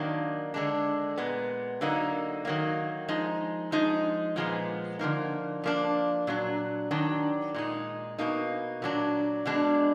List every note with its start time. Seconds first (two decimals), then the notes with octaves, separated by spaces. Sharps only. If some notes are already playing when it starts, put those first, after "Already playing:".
Already playing: D#3 F#3 A#3 D4
0.54 D3 G#3 D4
1.17 A#2 G#3 B3
1.81 D3 F#3 A#3 D#4
2.45 D#3 F#3 A#3
3.08 F3 G#3 D#4
3.72 F3 G#3 D#4
4.36 A#2 F3 G#3 B3
4.99 D3 F3 A#3 D#4
5.64 F3 A#3 D4
6.27 A#2 F#3 D4
6.91 D#3 F#3 D4
7.54 A#2 G#3 D#4
8.19 B2 A#3 D#4
8.82 A#2 F#3 D4
9.46 B2 G#3 D4